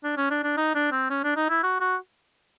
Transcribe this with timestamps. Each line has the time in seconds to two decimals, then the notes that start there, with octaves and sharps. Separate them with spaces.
0.04 D4
0.17 C#4
0.30 D4
0.44 D4
0.57 D#4
0.75 D4
0.92 C4
1.10 C#4
1.24 D4
1.36 D#4
1.49 E4
1.63 F#4
1.81 F#4